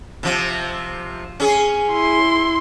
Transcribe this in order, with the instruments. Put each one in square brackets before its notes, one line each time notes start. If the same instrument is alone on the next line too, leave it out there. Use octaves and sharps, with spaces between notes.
[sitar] C3 F3
C#4 G#4
[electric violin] E4 C6